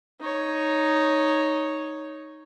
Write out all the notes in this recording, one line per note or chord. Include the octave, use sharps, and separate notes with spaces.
D#4 C#5